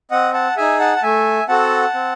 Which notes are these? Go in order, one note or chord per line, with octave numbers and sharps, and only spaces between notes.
C4 D#5 F#5
F#5 A5
D#4 G#4 E5 G#5
F#5 A5
A5
A3 E5 G#5
C4 F#4 A4 F#5 A5
C4